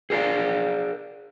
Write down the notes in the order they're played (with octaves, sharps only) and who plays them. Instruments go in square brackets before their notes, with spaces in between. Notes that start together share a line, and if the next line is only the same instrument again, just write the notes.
[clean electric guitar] G#4 A#4 C5 D5 F5